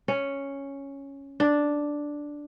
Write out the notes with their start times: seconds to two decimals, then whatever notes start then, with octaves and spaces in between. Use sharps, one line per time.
0.08 C#4
1.40 D4